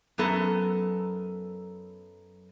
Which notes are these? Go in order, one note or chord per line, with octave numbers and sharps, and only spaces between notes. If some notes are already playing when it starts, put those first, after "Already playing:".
F#2 F#3 B3 A4 A#4